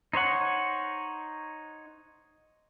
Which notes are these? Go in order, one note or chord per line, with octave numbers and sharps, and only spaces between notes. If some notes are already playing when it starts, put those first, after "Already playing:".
D#4 C5 C#5 F#5